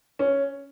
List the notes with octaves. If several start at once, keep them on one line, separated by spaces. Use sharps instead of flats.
C#4